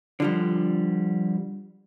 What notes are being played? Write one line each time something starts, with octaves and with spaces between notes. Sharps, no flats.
D3 F3 G3